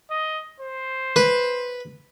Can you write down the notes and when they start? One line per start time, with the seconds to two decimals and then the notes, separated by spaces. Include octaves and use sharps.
0.11 D#5
0.60 C5
1.16 B4